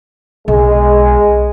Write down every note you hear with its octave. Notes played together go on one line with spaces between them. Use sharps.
B1 G#3